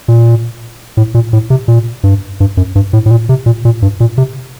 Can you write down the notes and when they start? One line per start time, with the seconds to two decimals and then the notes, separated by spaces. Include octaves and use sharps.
0.08 A#2
0.97 A2
1.14 A#2
1.33 A2
1.50 C3
1.68 A#2
2.04 G2
2.40 G2
2.57 F#2
2.75 G2
2.93 A2
3.06 A2
3.11 A#2
3.29 C3
3.46 A#2
3.65 A#2
3.82 G2
4.00 A#2
4.18 C3